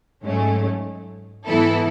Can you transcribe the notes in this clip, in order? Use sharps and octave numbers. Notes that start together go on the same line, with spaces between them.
G#2 F#3 A3 C#4
G#2 E3 B3 E4 A4